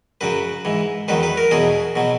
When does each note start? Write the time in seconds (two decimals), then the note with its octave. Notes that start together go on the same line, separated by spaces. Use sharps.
0.21 F#2 C#3 F#3 B4
0.65 G#2 E3
1.08 E2 D#3 F#3 B4
1.23 B4
1.37 A#4
1.51 E2 B2 F#3 G#4
1.96 B2 F#3